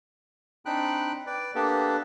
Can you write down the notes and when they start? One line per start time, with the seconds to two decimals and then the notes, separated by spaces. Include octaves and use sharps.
0.66 C4 D4 D#4 G5 B5 F#6
1.27 B4 D5 G5
1.55 A#3 B3 D4 G4 A4 B4